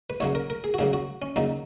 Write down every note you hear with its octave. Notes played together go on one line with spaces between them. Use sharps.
B4
D#2 C#3 F#3 A#3 C#5
A#4
A#4
G#4
F#4
D#2 C#3 F#3 A#3 G#4
F#4
C#4
D#2 C#3 F#3 A#3 D#4